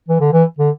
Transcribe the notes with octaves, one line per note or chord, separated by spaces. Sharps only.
E3
D3
E3
D3